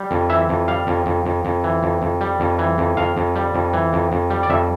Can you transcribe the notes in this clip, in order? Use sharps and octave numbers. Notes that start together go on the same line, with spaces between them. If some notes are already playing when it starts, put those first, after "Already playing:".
Already playing: G3
F2
E3 E5
F2
G3 F5
F2
F2
F2
F2
E3
F2
F2
G3
F2
E3
F2
F2 F5
F2
G3
F2
E3
F2
F2
G3
D5
F2 E5